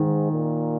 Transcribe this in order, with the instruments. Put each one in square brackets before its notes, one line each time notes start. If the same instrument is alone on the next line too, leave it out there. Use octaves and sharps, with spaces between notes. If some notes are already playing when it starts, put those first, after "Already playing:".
Already playing: [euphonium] G#2 [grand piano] D#3
[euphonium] A#2